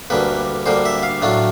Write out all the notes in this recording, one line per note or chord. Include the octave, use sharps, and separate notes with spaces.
D2 D3 G3 A#3 B4
D2 D3 G3 A#3 C5
E5
F5
A2 F#3 A3 D4 F4